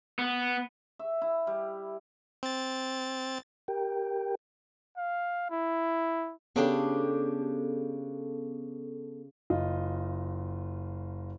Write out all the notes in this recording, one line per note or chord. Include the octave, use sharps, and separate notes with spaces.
B3
E5
E4
G3
C4 A6
G4 A#4 G5
F5
E4
C#3 B3 D4 G4 A4
F#1 F4 D#5